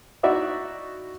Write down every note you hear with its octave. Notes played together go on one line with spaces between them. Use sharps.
D#4 E4 F#4 D5 E5